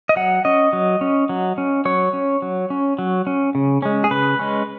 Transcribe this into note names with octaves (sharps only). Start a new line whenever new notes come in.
D#5
F#3 F#5
C#4 D#5
F#3
C#4
F#3
C#4
F#3 C#5
C#4
F#3
C#4
F#3
C#4
C#3
G#3 C#4
G#4
C#3 B4
G#3 C#4